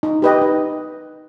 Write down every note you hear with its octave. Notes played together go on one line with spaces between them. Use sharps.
D#4
G4 B4 D#5 G5
D#4